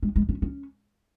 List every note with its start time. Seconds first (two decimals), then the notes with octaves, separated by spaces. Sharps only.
0.03 G#3
0.16 G#3
0.29 C#4
0.42 C#4